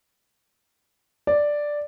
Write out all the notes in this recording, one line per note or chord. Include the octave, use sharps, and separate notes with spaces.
D5